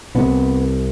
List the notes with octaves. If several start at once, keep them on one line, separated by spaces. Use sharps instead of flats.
C2 C3 B3